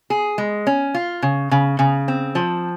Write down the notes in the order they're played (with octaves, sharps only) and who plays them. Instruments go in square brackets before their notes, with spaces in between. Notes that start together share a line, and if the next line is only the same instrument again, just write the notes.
[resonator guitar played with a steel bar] G#4
G#3
C#4
F4
C#3
C#3
C#3
C4
F3